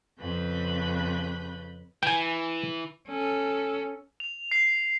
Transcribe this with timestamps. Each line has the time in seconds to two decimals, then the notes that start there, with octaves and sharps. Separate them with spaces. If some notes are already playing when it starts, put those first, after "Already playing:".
0.20 F2 C#3 B4 B5 G6
2.03 E3 G5 G#5
3.08 C#4 A4
4.20 F7
4.51 C7